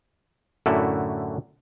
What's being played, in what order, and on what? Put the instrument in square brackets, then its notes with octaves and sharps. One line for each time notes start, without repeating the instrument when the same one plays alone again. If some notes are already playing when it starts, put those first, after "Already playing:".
[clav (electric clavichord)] F#2 A2 D3 A3 E4 F#4